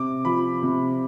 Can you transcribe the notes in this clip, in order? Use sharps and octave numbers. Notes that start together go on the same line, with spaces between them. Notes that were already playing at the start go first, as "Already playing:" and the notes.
Already playing: C3 D6
F3 B5
C3